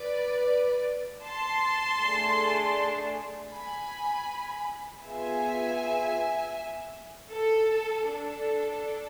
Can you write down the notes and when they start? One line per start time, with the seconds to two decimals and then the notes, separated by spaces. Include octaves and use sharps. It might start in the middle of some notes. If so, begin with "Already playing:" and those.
Already playing: B4 D5
1.26 A5 C6
2.01 A3 D4 G#4
3.53 G#5 B5
5.03 B3 F4 G#4 E5 G#5
7.31 A4
8.06 D4 A4